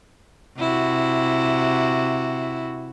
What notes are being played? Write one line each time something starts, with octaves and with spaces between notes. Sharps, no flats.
C3 E4 F#4